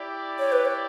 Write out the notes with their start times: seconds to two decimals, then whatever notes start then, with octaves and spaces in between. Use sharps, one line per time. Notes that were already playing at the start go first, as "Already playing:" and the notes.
Already playing: E4 G4 D5
0.39 C#5
0.52 B4
0.65 C#5